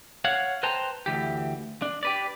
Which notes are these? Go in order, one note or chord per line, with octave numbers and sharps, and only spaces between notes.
C#5 F5 F#5
B4 C5 G5 A5 A#5
D2 E3 G4
D4
G4 B4 D5